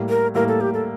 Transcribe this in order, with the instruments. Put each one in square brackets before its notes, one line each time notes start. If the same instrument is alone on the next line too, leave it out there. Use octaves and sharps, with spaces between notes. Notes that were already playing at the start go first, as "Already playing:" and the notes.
Already playing: [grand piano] A2 G3 A#3
[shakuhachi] A#4
[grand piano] A2 G3 A#3 [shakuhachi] A#4
[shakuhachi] A4
G4
A4